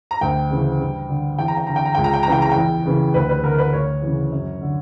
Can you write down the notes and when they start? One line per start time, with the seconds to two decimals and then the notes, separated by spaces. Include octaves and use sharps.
0.11 A#5
0.21 D2 G5
0.50 C#3 E3
0.80 G2
1.09 D3
1.38 E2 G5
1.48 A#5
1.57 G5
1.67 D3 A#5
1.76 G5
1.85 A#5
1.95 C#2 G5
2.04 A#5
2.14 G5
2.23 C#3 E3 A#5
2.32 G5
2.42 A#5
2.52 E2 G5
2.85 C#3 E3
3.14 D2 B4
3.29 B4
3.43 D3 A#4
3.58 B4
3.73 D2 C#5
4.02 C#3 E3
4.32 F#2
4.61 D3